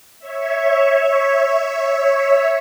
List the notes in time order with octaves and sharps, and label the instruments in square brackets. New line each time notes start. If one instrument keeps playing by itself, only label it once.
[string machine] C#5 E5